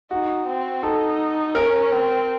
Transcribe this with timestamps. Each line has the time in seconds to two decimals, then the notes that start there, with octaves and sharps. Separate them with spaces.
0.11 D#4 F#4
0.47 C4
0.83 D#4 A4
1.55 C#4 A#4
1.92 C4